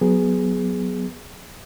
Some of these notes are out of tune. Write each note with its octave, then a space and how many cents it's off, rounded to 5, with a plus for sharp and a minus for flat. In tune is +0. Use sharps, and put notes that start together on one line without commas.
F#3 +0 B3 +0 G#4 +0